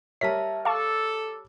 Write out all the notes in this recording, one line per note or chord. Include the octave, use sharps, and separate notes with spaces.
G3 A#4 C#5 E5 A5 B6
A4 F5 A5 C#6 D6